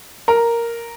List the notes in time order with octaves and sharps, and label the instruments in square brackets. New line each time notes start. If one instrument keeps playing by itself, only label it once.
[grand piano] A#4